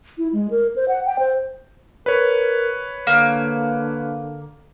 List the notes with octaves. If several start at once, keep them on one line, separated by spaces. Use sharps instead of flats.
E4
G#3
A#4
C5
F#5
G5
C5
A#4 B4 C#5
D3 A#3